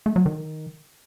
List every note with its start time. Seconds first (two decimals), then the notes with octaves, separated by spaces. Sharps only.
0.06 A3
0.16 F#3
0.26 D#3